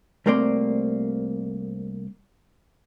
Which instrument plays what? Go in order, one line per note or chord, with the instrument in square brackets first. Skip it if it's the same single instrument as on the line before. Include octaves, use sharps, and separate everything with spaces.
[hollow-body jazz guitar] C2 A3 A#3 C4 D5 C6